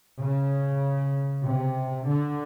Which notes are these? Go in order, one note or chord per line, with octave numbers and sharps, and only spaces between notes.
C#3
C3
D3